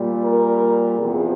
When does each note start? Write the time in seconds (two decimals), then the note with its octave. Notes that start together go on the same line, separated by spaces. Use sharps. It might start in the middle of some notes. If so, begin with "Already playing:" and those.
Already playing: A#2 G3
0.23 A#4
0.99 E2 C3 F3 G#4